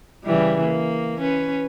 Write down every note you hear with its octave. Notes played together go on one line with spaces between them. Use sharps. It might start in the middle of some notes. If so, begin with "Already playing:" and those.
C#3 E3 G3
A#3
C#4 B4